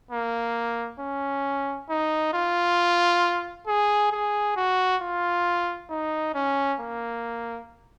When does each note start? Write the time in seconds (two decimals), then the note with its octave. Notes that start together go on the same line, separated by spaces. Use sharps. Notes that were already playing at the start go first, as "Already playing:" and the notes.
0.11 A#3
1.00 C#4
1.90 D#4
2.34 F4
3.67 G#4
4.12 G#4
4.56 F#4
5.01 F4
5.90 D#4
6.34 C#4
6.80 A#3